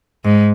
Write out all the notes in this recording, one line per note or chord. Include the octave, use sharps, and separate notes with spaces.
G#2